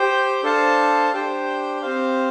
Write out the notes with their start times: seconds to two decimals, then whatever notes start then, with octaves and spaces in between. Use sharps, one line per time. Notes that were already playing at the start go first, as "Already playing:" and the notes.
Already playing: G4 C5 G5
0.43 D4 A4 C5 F5 A5
1.13 D4 G4 C5 G5
1.82 C4 G4 C5 F5